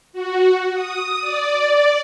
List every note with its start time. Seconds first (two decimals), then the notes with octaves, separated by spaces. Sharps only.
0.13 F#4
0.74 D#6
1.21 D5